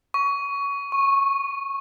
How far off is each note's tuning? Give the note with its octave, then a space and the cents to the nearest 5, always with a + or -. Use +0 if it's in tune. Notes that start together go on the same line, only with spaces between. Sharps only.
C#6 +20
C#6 -15